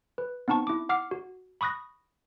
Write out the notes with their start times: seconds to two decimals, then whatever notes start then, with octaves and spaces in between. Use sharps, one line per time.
0.18 B4
0.48 B3 C4 D#4 A5 C#6
0.67 E4 D6
0.89 F#5 D6 F6 C7
1.11 F#4
1.61 B5 C#6 D#6 F#6 A#6